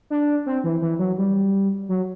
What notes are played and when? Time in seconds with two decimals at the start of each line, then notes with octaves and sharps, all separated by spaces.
0.10 D4
0.46 C4
0.64 E3
0.82 E3
0.99 F#3
1.18 G3
1.89 F#3